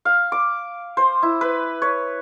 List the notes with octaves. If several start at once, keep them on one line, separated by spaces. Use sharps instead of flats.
F5
D6
C5
E4
B4
C#5